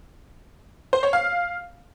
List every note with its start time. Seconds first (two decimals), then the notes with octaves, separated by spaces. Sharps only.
0.93 C5
1.03 C#5
1.13 F5